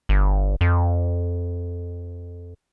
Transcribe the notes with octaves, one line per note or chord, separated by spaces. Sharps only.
G1
F2